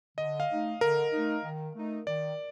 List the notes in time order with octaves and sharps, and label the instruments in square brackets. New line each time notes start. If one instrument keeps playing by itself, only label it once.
[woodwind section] D3 [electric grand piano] D#5
[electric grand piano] F5
[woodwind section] A3 D#4
[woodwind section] D3 [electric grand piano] A#4
[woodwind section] A3 D#4
D#3
A3 D#4
[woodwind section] D#3 [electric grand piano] D5